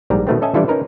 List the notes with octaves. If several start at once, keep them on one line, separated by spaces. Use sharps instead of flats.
A#1 G#2 G3 A#5
B2 D#3 A3 B3 C4
C#4 A4 D#5 E5 G#5 A5
E3 G3 D4 E4 F4 A4
C#4 D#4 A#4 B4